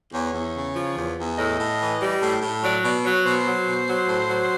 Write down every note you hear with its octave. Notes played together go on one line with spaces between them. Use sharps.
E2 C#5
E2
C#3
F3
E2
E2
A2 D#5
A2
E3
G3
A2
A2
F#3 D5
B2 D5
F#3 C#5
B2 C5
F#3
B2
F#3
A2
F#3